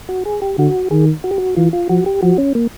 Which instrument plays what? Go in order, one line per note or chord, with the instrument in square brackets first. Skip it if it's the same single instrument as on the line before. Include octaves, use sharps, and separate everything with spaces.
[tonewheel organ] F#4
G#4
G4
[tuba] D3 [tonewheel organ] F#4
[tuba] D#3 [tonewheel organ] G#4
[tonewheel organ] F#4
G4
F#4
[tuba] E3 [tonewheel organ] F4
[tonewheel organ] F4
[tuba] F3 [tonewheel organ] F#4
[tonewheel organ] G4
[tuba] F3 [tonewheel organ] F#4
[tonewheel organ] C#4
A#3